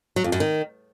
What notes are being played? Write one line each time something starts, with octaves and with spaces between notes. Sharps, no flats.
F#3
F2
F#2
D#3